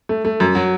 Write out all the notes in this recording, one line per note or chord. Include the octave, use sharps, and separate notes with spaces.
A3
A3
F#2
F#3